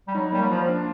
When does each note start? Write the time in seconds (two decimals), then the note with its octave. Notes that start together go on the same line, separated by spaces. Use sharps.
0.08 G3
0.15 F#3 D#4
0.32 G3 A#3
0.42 F#3
0.50 F3 F4
0.69 D4